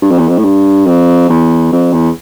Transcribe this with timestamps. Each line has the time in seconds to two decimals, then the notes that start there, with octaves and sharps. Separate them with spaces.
0.02 G2
0.11 F2
0.18 E2
0.28 F2
0.38 A2
0.44 G2
0.86 F2
1.29 E2
1.72 F2
1.93 E2